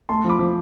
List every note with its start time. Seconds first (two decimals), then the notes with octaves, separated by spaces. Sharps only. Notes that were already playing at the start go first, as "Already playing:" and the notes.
0.09 A3 A5 C6
0.24 F3 B5 D6
0.39 F3